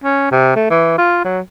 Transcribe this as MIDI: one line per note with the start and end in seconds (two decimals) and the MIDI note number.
0.04 0.31 61
0.32 0.55 48
0.56 0.70 57
0.70 0.94 52
0.98 1.22 65
1.25 1.40 54